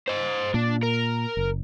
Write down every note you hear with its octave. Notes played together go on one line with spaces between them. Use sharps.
C5 D#5
A#2 D4
A#4
F#1